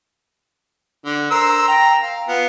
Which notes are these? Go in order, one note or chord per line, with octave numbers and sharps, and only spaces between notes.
D3
A#4 C5 E6
G5 A#5
F5
B3 F4 F5